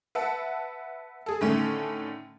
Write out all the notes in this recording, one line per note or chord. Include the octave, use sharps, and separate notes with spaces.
B4 E5 F#5 A5
G#4 A4
A2 D3 D#3 A3 C#4